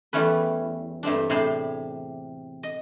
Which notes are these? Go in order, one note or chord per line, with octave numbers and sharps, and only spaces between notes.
E2 G3 A3 C#4 B4
G2 A3 C4 D4
A2 C3 D4 G#4 C5 B5
D#5